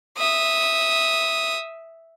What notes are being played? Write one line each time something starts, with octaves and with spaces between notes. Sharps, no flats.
E5 D#6